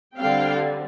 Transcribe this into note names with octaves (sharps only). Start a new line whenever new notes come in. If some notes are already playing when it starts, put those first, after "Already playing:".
D3 G3 C4 F5 G5